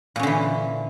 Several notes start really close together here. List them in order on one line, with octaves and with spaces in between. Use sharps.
A#2 C#4 D3 E3